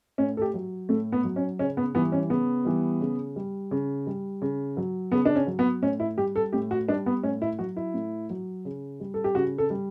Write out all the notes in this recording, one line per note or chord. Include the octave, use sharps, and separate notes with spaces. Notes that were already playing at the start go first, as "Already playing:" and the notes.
A2 C#4
A4
G4
F#3
A2 A3
B3
F#3
C#4
C#3 C#4
B3
E3 G3 B3
C#4
C#3 B3
E3 G3
C#3
G3
C#3
G3
C#3
F#3
C#3 B3
D4
C#4
F#3
B3
A2 C#4
E4
G3 G4
A4
A2 G4
F#4
G3 D4
B3
A2 C#4
E4
F#3 F#4
E4
A2
F#3
C#3
G3
A4
G4
C#3 F#4
A4
G3